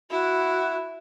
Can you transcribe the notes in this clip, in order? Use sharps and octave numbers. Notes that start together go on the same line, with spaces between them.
E4 F#4